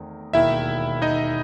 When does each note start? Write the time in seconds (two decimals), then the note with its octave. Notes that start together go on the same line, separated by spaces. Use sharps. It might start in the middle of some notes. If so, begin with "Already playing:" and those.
Already playing: E2 D#3 A3 C4
0.33 E1 D#2 D#3 E4 E5
1.02 D#4 D#5